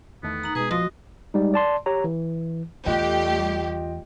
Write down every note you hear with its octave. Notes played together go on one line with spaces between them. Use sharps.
E2 D#3 A3 B3
D#4 A#5
B2 G#3 G#4 B4
A#1 F3 F#4 D#5 C6
G3 G#3 D#4
D5 A5 C6
G4 C#5 A#5
E3
E2 G3 A3 F4 G4 D#5 G5